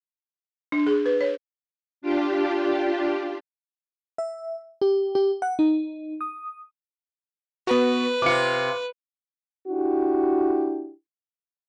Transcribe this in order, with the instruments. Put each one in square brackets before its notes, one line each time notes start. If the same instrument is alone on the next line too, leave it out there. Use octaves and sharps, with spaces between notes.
[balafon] D4
G#4
B4
C#5
[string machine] D4 F4 G4
[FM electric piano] E5
G4
G4
F#5
D#4
D#6
[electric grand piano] B3 F#4 [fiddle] B4
[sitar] C3 F4 [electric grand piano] D6 C#7
[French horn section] D4 E4 F#4 G4